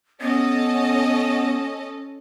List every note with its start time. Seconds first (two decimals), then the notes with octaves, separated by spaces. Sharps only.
0.21 B3 C#4 A4 D#5